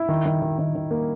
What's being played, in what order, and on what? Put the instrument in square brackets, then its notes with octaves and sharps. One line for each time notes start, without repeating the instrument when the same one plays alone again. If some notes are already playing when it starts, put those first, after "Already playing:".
Already playing: [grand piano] E4
D#3
D#3
D#3
D#3
D#3
A#3